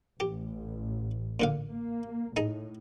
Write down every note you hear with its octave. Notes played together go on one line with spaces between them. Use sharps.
A1 G4
A#2 D3 F5
A#3
A2 D#4 G#4